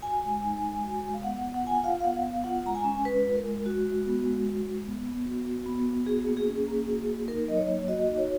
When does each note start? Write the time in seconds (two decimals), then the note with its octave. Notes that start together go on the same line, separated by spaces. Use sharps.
0.02 F#4 G#5
0.24 G#3
0.43 D#4
0.63 G#3
0.84 F#4
1.03 G#3
1.14 F5
1.23 B3 F#5
1.43 B3
1.54 F#5
1.63 F4 G#5
1.75 F#5
1.83 F4 F5
2.00 F5
2.04 B3 F#5
2.24 B3 F5
2.44 F4 F#5
2.65 G#3 A#5
2.75 G#5
2.84 C#4
3.04 G#3 B4
3.24 F4
3.36 A#4
3.44 G#3
3.66 F#4
3.85 G#3
4.05 B3
4.26 G#3
4.45 F#4
4.66 G#3
4.86 B3
5.06 B3
5.26 F#4
5.46 F#4
5.66 B3
5.86 B3
6.06 F#4 G#4
6.26 A#3
6.37 G#4
6.47 C#4
6.68 A#3
6.88 F#4
7.07 A#3
7.28 D#4 A#4
7.48 F#3 D#5
7.57 C#5
7.68 A#3
7.88 F#4 D#5
8.08 D#4
8.18 C#5